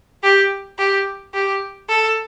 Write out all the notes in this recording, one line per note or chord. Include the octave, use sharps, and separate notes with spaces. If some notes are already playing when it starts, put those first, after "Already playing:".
G4
G4
G4
A4